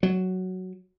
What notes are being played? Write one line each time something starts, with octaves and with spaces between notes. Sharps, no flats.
F#3